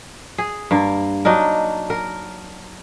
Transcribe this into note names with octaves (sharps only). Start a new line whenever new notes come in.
G#4
G2 A#3
F#3 D4 D#4 A#4
A#4